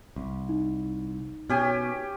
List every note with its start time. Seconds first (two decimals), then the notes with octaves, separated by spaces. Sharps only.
0.16 C2
0.49 D#4
1.50 B2 C#4 G4 G#5